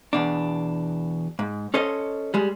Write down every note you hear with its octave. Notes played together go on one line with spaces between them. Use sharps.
E2 B2 D4
G#2
C#4 A4 C5 C#5 D#5
G3 G#3